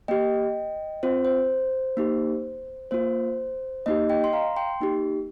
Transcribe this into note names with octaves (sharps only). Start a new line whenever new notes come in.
A#3 G4 D#5 G5
C4 F4 C5
C5
A#3 D#4 G4
A#3 F4 C5
A#3 D#4 G4 D#5
D#5 G5
C6
F5 A#5
G5 C6
A#3 D#4 G4